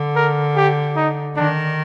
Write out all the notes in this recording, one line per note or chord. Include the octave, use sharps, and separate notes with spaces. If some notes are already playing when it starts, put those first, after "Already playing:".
Already playing: D3
A#4
G4
D#4
D#3 D4